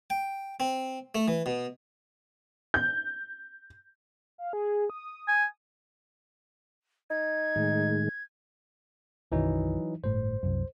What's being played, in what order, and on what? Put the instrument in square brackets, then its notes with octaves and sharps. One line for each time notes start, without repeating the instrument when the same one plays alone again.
[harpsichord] G5
C4
A3
E3
B2
[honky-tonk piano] G6
[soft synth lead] F5
G#4
D#6
[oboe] G#5
[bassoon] D#4 [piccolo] G#6
[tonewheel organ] A2 D#3 G#3
[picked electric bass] B1 F#2 D#3 [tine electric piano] E3 F#3 D#4
[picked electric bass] G1 A2 [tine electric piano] C5
[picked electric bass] C2 F#2